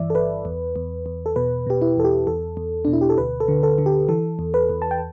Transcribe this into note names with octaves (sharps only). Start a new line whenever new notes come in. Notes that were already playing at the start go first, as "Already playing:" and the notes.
Already playing: G2 E3 D5 E5
A4
G1 B4
E2
E2
E2
A4
B2 B4
B2 G4
E4
E2 A4
G4
E2 A4
E2
B2 D4
E4
G4
A4
D2 B4
A4
D3
A4
D3
G4
E3 A4
E2
B4
E2
A5
G5